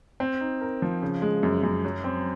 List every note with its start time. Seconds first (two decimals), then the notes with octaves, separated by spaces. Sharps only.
0.20 C4
0.41 D#4
0.61 A#4
0.82 F3
1.02 C#3
1.22 G#3
1.43 F#2
1.63 F#2
1.84 F#3
2.04 C4